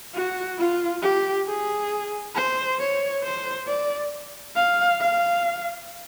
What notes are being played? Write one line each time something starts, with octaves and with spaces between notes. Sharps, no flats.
F#4
F4
G4
G#4
C5
C#5
C5
D5
F5
F5